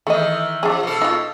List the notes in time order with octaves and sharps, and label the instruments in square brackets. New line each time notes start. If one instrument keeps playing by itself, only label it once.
[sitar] D#3 E3 [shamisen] A3 D#5
[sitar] F3 [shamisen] D4 G#4
[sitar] B2 A4
[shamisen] D#4 F4